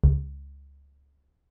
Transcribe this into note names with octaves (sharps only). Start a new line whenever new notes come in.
C#2